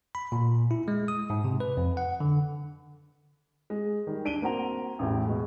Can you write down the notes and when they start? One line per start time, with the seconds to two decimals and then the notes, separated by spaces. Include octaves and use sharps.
0.15 B5
0.32 A#2
0.71 E4
0.88 G#3
1.08 D#6
1.30 G#2
1.44 C3
1.60 B4
1.77 F2
1.97 F#5
2.20 D3
3.70 G#3
4.07 D#3 G3
4.25 D4 D7 D#7 G7
4.42 A#3 C4 F#4 A#5 F7
4.99 A1 E2 A2
5.26 B2 G#3